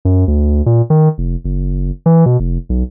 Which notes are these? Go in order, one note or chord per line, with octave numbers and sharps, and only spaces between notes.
F#2
D2
A#2
D#3
F1
F#1
E3
B2
F1
B1